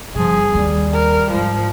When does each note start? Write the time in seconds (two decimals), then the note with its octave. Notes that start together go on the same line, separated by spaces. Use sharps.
0.16 G1 C#3 F3 G#4
0.54 D#2 G3 D4
0.93 A#4
1.31 G#2 F3